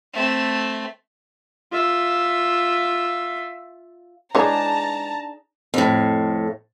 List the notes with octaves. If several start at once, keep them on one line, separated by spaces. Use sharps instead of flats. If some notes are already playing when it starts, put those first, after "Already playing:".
A3 C4
F4 E5
E3 G#3 D4 D#4 G#4 C#5 A5 A#5
F2 A2